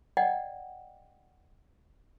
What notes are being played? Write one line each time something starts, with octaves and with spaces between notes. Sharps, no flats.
D5 D#5 F#5 G5